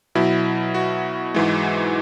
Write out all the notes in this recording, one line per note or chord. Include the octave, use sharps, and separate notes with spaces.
B2 F#3 E4
F#4
G#2 E3 G#3